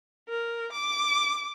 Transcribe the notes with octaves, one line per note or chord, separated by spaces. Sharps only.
A#4
D6